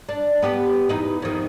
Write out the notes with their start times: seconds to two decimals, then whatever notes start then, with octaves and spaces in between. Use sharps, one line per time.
0.09 D4
0.42 B3 G4 B4
0.89 E2 D#4 B4
1.22 F2 D#3